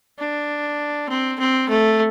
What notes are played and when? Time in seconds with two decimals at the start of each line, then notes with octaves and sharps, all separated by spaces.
0.19 D4
1.09 C4
1.39 C4
1.69 A3